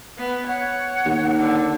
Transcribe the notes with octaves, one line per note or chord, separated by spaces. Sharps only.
B3
C#5 F#5
D#2
D3